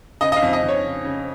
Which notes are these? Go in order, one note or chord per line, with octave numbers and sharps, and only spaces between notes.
C#3 D#5
D#5
F5
F2
D#5
F2
C#5
C#3
C#3